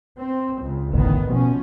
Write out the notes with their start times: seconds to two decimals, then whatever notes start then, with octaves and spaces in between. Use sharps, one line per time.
0.18 C4
0.61 C#2
0.93 E1 A1 D2 D#3 B3
1.30 B2 F3 C#4